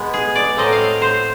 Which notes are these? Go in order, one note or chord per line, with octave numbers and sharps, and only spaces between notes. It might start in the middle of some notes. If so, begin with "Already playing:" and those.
Already playing: B2 G#3 B3
G#4
D5
A2 F#3 A3 C4 D#5
F5
C5